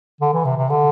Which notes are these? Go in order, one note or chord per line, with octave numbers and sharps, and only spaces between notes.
D3
E3
C3
C3
D3